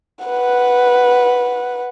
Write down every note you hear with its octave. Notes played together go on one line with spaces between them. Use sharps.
B4 F#5